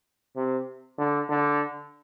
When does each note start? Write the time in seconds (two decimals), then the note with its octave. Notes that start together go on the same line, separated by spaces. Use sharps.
0.36 C3
0.99 D3
1.29 D3